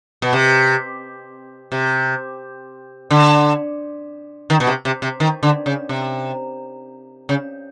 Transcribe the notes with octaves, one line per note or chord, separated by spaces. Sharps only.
B2
C3
C3
D3
D#3
B2
C3
C3
C3
D#3
D3
C#3
C3
C#3